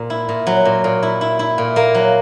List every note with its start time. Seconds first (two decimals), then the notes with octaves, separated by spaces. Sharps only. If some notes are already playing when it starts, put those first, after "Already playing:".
Already playing: A#2
0.10 E4
0.29 A#2
0.47 F#3
0.65 A#2
0.84 A#2
1.03 E4
1.21 E4
1.39 E4
1.58 A#2
1.76 A#3
1.95 F#3